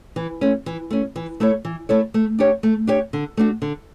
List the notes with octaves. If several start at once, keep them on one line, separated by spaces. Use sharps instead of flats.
E3
A3 C#4
E3
A3 C#4
E3
A3 E4 A4 C#5
E3
A3 E4 A4 C#5
A3
D4 G4 C#5
A3
D4 G4 C#5
D3
A3 D4 F#4
D3